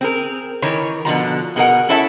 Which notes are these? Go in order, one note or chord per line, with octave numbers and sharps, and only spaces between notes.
C4 G#4 A#4
D#3 E3 A#4 C#5
B2 D3 F3 A#5
B2 G#4 A#4 F#5
C#4 E4 A4 C#5 E5 A5